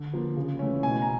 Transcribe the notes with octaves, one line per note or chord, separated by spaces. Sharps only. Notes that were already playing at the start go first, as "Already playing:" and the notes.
Already playing: D3
F3 A#3
C#3
E3 A3 C#4
B2 G#5
A#5